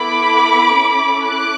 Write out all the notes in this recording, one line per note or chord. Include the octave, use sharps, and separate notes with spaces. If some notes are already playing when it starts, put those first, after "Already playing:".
Already playing: B3 E4 A4 B5 D6
C#4 E4 A4
D6 F#6